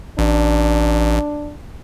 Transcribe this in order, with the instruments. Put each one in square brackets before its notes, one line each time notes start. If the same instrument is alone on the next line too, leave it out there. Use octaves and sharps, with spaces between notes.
[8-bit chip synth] A1 [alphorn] D4